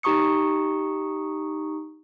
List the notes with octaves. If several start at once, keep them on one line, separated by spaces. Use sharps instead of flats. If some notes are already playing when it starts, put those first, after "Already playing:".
D#4 G4 A#5 C#6 D#6 C#7